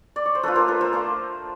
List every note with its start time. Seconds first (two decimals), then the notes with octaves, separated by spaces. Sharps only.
0.16 D5
0.26 C#5
0.35 C5
0.43 A3 D4 F4 A4 B4
0.55 A#4 C5
0.68 A4 B4
0.81 A#4 C5
0.93 A3 D4 F4